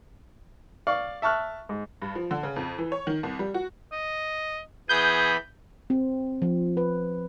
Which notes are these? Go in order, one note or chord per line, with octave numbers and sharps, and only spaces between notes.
D5 F5 C#6
E5 A5 C#6 F6 F#6
G#2
G2
F3
D3
C#3
F2
E3
C#5
D#3
C2
G3
F#4
D#5
E3 B3 G#4 B5 G6
C4
F3
B4